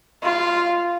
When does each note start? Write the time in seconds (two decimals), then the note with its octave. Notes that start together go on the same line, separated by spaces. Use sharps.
0.23 F4